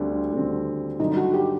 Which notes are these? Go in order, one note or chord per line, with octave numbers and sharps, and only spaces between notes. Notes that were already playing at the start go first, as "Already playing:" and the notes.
Already playing: D2 D3 G3 C4
D2 D3 G3 C4
G2 D3 F#3 D#4
F#4
G4